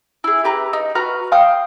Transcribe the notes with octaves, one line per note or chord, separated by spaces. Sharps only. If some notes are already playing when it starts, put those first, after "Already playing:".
E4 G#4
G4 B4 A#5
D#4
F#4 B4 A#5 F6
F5 G5 D#6 F6